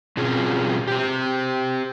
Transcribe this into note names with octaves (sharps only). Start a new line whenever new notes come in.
B2 C4 C#4 F4 G#4
G4 C5